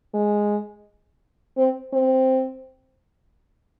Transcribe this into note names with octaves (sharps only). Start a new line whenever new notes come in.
G#3
C4
C4